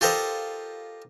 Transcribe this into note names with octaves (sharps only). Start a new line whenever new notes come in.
F4 G4 A4 A#4 C5 D#5